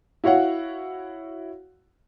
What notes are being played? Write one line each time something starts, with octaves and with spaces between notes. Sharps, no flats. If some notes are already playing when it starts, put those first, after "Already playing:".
E4 F#4 C#5 F5 F#5